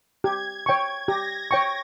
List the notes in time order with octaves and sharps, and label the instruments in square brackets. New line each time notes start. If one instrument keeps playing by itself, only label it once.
[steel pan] G4 [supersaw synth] G#6
[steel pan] C#5 G5 C#6
[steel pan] G4 [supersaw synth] A#6
[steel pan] C#5 G5 C#6